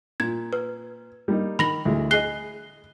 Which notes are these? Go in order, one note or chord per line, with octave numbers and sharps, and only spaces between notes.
A#2 G#6
B4
G3 A#3 D#4
D#3 B5 A#6 F#7
D2 E3 G#3
G#4 D#5 F#6 C7 G7